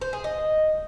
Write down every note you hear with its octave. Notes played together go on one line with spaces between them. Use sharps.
C5
G#4
D#5